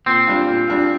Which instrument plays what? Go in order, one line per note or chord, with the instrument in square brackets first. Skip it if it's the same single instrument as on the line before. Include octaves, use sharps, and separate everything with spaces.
[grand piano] A#2 [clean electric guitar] C4
[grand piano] G3 D4 F4
A#2
G3 D4 F4